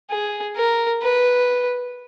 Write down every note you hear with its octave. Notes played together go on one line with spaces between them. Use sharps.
G#4
A#4
B4